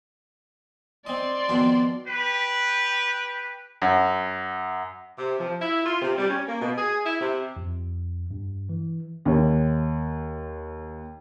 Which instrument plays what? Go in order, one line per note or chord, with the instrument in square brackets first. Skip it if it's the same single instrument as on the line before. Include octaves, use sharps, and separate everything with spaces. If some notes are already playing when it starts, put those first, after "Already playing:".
[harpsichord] C4 D#5 [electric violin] D5 C6
[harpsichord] F2 B2 D#3
[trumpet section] G4 B4
[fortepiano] F#2
[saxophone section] C3
F3
E4
F4
C3
G3
C#4
A#3
B2
G#4
E4
C3
[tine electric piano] F2
G2
E3
[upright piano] D#2 C#5